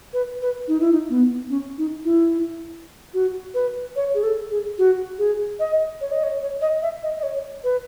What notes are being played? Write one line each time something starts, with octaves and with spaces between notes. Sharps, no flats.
B4
B4
D#4
E4
D#4
B3
C#4
D#4
E4
F#4
B4
C#5
G#4
A4
G#4
F#4
G#4
D#5
C#5
D#5
C#5
C#5
D#5
E5
D#5
D#5
C#5
B4